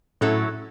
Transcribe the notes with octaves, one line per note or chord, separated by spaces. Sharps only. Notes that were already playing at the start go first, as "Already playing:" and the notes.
A2 F#3 C#4 E4 A4